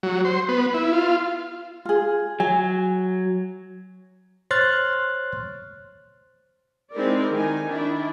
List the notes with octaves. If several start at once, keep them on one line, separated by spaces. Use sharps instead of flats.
F#3
C5
B3
E4
F4
F4 G#4
F#3 G#5
C5 C#5 C6 F6 F#6 A6
G#3 C4 D#4 E4 A#4 D5
D#3 D#4 G#5
D#3 D4 E4